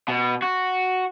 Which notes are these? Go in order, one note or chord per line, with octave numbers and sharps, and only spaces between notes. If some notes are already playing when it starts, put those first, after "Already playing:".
B2
F#4